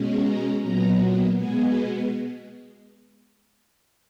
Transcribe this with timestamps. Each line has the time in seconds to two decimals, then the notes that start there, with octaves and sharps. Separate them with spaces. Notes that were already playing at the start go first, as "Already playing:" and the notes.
Already playing: B2 G#3 C#4
0.24 A#5
0.62 A#2 F#3 B3 A#5
1.37 B2 G#3 B3 G#5